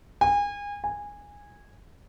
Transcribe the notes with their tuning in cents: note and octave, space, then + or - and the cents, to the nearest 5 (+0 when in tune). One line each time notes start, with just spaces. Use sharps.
G#5 -30
G#5 -15